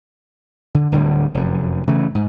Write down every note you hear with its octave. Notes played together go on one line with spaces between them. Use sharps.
D3
D1 D2 D3 G3
F1 F#2
C#3 E3 A3
G#2